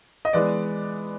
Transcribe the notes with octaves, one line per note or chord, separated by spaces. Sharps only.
D#5
E3 G#3 B3 D5